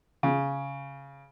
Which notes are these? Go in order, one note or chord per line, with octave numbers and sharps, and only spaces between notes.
C#3